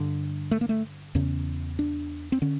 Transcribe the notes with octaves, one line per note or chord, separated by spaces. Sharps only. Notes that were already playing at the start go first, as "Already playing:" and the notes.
Already playing: G2 D3
A3
A#3
A3
E2 C#3 C#4
D4
C4
D3 C#4